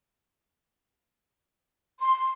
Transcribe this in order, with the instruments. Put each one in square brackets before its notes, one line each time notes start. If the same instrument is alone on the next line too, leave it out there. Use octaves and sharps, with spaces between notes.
[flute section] C6